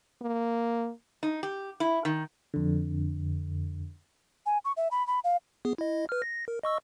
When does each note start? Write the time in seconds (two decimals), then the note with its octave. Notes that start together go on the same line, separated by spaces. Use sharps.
0.22 A#3
1.23 D#4
1.43 G4
1.80 E4
2.05 D#3
2.54 F2 D3
4.46 G#5
4.65 C#6
4.77 E5
4.91 B5
5.07 B5
5.24 F5
5.65 B3 G#4
5.78 E4 D#5
6.09 B4 F6
6.22 A#6
6.48 A#4
6.63 D#5 C#6 E6